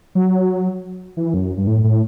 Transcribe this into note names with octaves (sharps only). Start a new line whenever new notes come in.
F#3
E3
F#2
G2
A2
A2